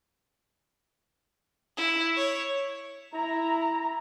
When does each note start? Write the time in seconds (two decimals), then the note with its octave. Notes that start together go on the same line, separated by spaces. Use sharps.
1.77 E4
2.16 C#5
3.14 E4 A#5